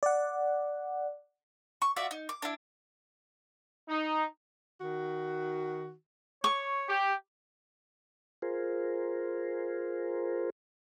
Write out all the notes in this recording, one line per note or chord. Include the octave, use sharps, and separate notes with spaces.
D5 F#5
C#6
F4 F#4 D5 E5
D#4
D6
D4 E4
D#4
D#3 F#4
C#5 C#6
G4
F4 G#4 A#4 C5